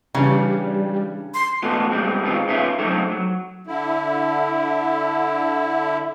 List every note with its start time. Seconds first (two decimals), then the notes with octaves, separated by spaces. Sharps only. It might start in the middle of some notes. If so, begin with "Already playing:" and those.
0.15 C#3 E3 G3 D4
1.34 C6
1.63 E2 B2 A3 F#4 A4 B4
1.91 G2 B2 G3 G#3 C4
2.24 B2 D#3 G#3 C4 F4
2.47 B2 D#3 B3 C#4 F4 E5
2.78 C3 F#3 A3 C4 D4 D#4
3.12 F#3
3.67 D3 E4